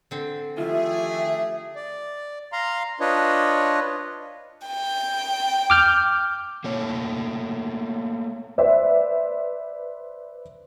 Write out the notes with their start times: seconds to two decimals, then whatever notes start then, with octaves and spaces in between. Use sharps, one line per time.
0.11 D3 C4
0.58 D#3 F3 A3 F4 G4 G#4 E5
1.76 D5
2.52 F5 A#5 C6
3.00 D4 F4 B4 C#5 D#5
4.68 G5
5.70 D6 F6 G6
6.64 A3 A#3 C#5
8.58 B4 C5 D5 E5